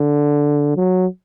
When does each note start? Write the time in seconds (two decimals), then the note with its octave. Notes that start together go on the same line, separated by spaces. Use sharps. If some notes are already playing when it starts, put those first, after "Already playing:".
Already playing: D3
0.76 F#3